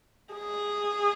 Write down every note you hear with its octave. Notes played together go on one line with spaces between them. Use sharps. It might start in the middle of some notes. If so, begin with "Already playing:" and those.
G#4